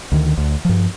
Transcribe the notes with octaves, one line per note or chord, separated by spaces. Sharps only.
D2 D#3
D2
G2 F3